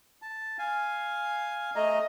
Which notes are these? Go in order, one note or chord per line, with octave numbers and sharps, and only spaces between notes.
A5
F5 G#5
A3 D#5 A#5